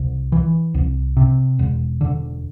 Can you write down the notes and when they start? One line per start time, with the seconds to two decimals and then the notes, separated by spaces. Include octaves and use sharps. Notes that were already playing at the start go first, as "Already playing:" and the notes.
Already playing: C2
0.32 E3
0.74 C2
1.17 C3
1.59 E1
2.01 D3